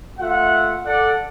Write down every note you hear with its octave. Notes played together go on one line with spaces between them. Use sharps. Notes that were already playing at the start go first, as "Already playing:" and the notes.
A3 F4 E5 F#5
A4 D5 F#5